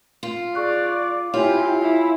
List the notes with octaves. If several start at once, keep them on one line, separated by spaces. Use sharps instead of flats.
F4
G#4 D5 C#6 F#6
D6
E4 F4 G4 C#5 G#5
E4